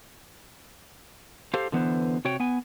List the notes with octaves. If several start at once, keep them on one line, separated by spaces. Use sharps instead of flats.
G4 A4 C5 F5
D3 E3 B3 B4 C5
C3 F#4 C#5 G5
B3 G#5